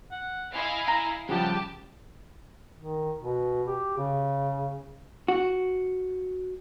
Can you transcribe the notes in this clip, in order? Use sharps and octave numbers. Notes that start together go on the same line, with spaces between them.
F#5
E4 D#5 F5 G#5 C6
A#5
C#3 F3 G3 G4 F#5 A5
D#3
B2
G4
C#3
F#4